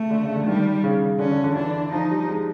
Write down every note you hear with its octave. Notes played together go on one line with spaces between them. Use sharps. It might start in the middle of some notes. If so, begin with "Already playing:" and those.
Already playing: C#3 A3
D3
C#3
D3
D#3 G3
C#3
D3 C#4
D3
D3
E3 D4
F3 D#4
G3
G#3